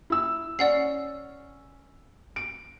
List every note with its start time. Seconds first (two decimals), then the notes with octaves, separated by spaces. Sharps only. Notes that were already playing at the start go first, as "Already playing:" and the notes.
0.10 E4 E6
0.59 C#4 D5 F#5 C7
2.36 D7